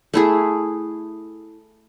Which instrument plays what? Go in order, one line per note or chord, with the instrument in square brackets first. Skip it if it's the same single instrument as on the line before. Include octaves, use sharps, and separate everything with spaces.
[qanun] A3 E4 G#4